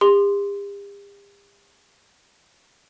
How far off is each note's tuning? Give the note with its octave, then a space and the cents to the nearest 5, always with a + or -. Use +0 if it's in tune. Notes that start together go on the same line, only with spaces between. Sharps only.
G4 +45 C6 +0